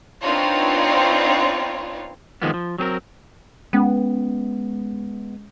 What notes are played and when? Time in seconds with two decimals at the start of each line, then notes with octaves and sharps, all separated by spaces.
0.21 B3 C4 D4 D#4 F4 C#5
2.42 D#3 F3 G#3 A#3 B3
2.54 F3
2.78 F#3 C4 G#4 A#4
3.73 G#3 B3 C#4